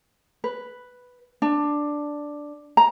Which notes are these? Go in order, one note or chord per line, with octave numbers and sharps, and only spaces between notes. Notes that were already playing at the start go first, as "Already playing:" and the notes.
B4
D4
A#5